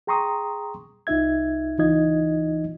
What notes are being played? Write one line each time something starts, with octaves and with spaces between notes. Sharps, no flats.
G#4 G5 A#5 C6 C#6 D#6
C2 D#4 F4 E5 G#6
C#2 E3 D#4 F4 D#5 G#6